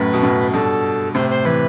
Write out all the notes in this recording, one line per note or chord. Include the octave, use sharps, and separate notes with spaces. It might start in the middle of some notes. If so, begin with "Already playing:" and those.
Already playing: F#2 A2 B4
B2
F#2 A2
G2 B2 A4
A2 C3 C5
C5
C3 E3 B4